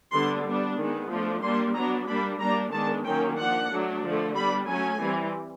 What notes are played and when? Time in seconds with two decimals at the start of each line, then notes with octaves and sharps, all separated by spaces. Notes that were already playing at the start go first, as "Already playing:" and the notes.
0.13 D3 G3 B3 D4 C6
0.44 G3 B3 D4
0.78 D#3 G#3 B3
1.10 F3 A3 D4
1.42 G3 A#3 D4 C6
1.74 F#3 B3 D4 A#5
2.08 G3 A#3 D4 B5
2.40 G3 A#3 D4 A#5
2.72 D#3 G#3 B3 D4 A5
3.05 D#3 F#3 A#3 C#4 G5
3.37 F3 A#3 D4 F#5
3.70 F#3 A3 D4
4.03 D3 F3 A3
4.35 G3 B3 D4 B5
4.67 F#3 A3 C#4 G#5
5.00 E3 G3 C4